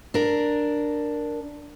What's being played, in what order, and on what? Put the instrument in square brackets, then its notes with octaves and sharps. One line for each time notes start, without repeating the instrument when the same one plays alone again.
[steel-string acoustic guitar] D4 A#4